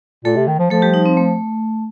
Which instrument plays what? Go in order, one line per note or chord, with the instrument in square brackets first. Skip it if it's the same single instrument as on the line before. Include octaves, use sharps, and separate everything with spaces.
[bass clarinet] A#2 [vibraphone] A3 A4
[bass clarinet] C3
D#3
F3
[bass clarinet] F3 [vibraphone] A3 A4
[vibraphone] G3 G4
D#4
C4
A3